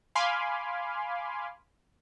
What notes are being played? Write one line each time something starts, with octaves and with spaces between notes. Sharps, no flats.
F5 G#5 B5 C6 D6 F6